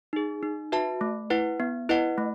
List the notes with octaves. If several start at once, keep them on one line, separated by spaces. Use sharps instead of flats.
D#4 G#4
D#4
F#4 B4 E5 A5
A3
E4 B4 F#5
B3
E4 B4 D#5 F#5
A3